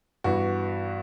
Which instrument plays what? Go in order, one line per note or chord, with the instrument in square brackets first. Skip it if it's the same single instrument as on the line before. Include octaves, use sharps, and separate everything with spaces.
[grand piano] G2 E3 B3 F#4